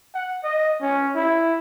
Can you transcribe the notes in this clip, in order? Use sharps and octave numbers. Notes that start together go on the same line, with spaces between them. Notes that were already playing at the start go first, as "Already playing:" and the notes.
F#5
D#5
C#4
E4